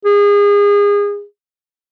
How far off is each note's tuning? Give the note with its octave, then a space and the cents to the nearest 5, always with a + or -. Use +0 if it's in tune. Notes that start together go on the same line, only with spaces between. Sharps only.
G#4 -30